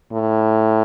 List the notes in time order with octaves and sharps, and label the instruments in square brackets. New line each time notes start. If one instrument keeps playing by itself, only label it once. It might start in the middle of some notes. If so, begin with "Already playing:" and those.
[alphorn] A2